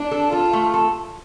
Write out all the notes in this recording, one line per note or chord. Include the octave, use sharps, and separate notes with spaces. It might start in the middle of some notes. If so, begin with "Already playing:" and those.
Already playing: D4
A4
F4 A4
A3
A4